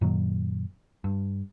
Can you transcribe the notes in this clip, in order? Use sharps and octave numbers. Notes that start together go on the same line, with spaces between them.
F#2 A#2 D#3 F#3
G2